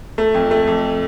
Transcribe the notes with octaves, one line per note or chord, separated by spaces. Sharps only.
A3
F2
A3
F2